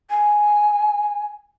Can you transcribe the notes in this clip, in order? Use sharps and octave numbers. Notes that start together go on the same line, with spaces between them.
G#5